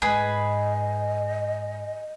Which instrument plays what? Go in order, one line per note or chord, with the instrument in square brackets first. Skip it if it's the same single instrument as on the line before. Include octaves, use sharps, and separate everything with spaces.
[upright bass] G#2 [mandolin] G#4 B4 [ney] D#5